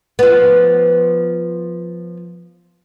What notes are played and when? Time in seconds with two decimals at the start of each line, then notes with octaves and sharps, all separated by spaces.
0.19 F3 B3